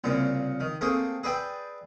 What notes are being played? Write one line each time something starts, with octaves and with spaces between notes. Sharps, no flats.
C2 A#2 C#3 A#3
D#3
A3 A#3 C4 G#4
G#4 B4 D5 E5 G5